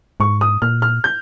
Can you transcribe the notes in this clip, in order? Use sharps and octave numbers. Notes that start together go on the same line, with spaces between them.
G#2 C#6
D#6
A#2 F6
F6
G6